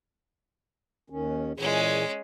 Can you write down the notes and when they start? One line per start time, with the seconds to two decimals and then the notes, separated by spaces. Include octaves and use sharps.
1.10 D#2 D#3 C#4
1.57 A#2 E3 G#3 C#4 G#4